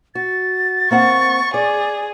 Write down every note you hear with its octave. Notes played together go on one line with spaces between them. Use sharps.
F#4 A6
A#3 C4 F#5 C#6
G#4 D5